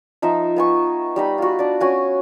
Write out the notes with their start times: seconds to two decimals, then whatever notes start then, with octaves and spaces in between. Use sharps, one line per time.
0.22 F3 D#4 E5
0.56 B3 G#5 C#6
1.16 G3 D#4 B5
1.38 F4 F#4
1.59 D4 D5
1.80 C#4 F#4 G#5